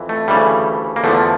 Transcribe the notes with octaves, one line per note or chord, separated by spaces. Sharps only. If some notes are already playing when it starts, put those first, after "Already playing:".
Already playing: F2 E3
A3
D2 C#3 E3 G3
A#3
E2 D3 F3 A3